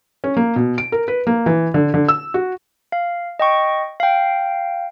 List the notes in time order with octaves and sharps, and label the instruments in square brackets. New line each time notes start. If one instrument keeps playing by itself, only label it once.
[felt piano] C#4
A#3
B2
D7
A#4
B4
A#3
E3
D3
D3
E6
F#4
[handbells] F5
D#5 G5 C#6
F5 G5